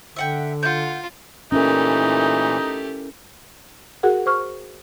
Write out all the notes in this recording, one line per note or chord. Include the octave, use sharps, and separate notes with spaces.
D3 E5 F#5 G5
F4 F#5 G6
A#2 E3 A3 C#4 D#4 E4 G4 A#4
F#4 G#4 A#4 F#5
C5 C#6 F6